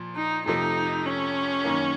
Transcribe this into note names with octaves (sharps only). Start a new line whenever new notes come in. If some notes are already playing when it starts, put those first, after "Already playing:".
Already playing: A#2 F3
D#4
F2 C3 F3 A3 D#4
C#4
F#2 D#3 A#3